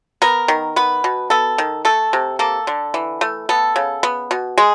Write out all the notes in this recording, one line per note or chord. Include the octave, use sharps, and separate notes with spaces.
B3 A#4
D#3
B3 B4
B2
B3 A4
D#3
A3 A4
C3
A#3 A4
D3
E3
A3
B3 A4
C#3
B3
B2
G#3 G#4